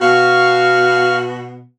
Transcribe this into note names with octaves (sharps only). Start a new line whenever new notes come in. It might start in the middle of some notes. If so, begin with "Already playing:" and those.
B2 F#4 F5 C#6 F6